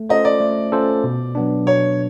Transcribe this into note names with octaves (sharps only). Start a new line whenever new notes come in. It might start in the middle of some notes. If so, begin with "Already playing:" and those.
Already playing: A3
C#4 F4 A4 C5 D#5
D5
A3
C#4 F4 A4 C5
B2
F#3 B3 D4
B2 C#5